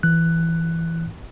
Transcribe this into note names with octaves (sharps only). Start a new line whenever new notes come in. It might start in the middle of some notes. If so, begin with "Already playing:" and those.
E3 F#6